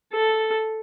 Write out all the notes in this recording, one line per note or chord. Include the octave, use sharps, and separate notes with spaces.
A4